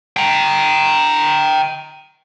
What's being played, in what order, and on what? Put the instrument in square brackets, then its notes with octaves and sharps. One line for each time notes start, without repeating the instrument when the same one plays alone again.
[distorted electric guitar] G5 A#5